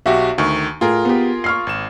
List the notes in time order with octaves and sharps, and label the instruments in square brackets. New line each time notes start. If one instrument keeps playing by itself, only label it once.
[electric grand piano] B1 F#4 G4 [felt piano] E5
[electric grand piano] D2 D#3 [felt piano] C#6
[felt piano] A2 [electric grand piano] F4 G#4 A#4
[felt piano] B3 G4
C#6 F6 C7
[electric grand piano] G#1 E7